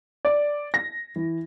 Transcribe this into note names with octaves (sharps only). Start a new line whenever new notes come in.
D5
A#6
E3